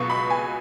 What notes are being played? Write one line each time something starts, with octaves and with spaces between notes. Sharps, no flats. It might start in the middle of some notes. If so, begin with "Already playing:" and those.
Already playing: C#2 B2 F#3 B3 C#6
B5
G#5